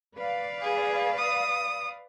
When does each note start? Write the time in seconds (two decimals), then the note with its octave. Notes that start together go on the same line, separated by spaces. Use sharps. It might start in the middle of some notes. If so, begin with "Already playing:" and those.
0.17 B4 D5 F5
0.62 G#4
1.18 D#6